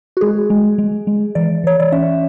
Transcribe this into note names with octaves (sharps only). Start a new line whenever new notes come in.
F#4
G#3 G#4
G#3
G#3
G#3
E3 D5
E3 C#5
D5
C#4 E5